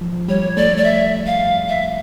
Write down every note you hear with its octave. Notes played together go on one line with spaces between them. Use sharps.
F3
G3 C#5
A3 D5
D5
E5
F5
E5